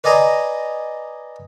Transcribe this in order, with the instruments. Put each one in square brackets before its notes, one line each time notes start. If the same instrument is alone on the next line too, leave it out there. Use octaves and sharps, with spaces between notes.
[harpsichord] B4 D5 D#5 G#5 A#5 C6